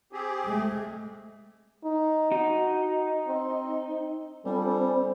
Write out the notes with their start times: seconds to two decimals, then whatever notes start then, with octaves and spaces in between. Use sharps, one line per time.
0.12 C4 G4 G#4
0.45 G#3 A3
1.84 D#4
2.32 D#4 F#4
3.27 C4
4.46 G3 C4 D4 F4 A4 C5 G#5 B5